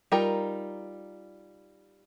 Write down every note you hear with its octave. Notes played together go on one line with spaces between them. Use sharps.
G3 D#4 F4 A#4 G5